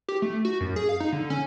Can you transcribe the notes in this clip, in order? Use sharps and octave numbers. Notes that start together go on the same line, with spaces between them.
G4
A3
F#4
F#2
G#4
F5
D#4
D3
C#4